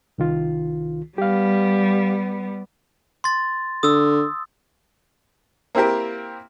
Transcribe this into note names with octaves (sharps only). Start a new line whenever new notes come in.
C2 D#3 F4
G3 B3 G4 F5
C6 A6
D3 D#6 E6
A#3 C4 E4 G4 A#4